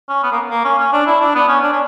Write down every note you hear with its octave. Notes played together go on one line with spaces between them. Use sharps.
C#4
B3
A#3
A#3
C#4
C#4
D4
E4
D4
B3
C#4
D4
C#4